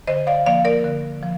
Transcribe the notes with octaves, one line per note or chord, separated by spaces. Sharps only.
D3 C5 D#5
D5 F5
F3 A#3 D5 F5
A#4 D5
D3
F3